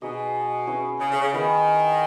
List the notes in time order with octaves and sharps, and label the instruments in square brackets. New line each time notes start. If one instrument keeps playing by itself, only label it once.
[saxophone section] B2 [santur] D#4 G#4 D#5
[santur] C#4 E4 G#4 B4
[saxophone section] C#3
C#3
C#3
[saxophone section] D#3 [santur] B3 E4 G#4 B4